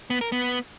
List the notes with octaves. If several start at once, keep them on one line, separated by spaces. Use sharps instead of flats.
B3
A#4
B3